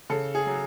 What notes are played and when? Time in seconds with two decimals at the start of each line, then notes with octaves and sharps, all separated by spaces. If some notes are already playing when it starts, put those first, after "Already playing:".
0.10 C#3 A4
0.35 G#4
0.46 F#3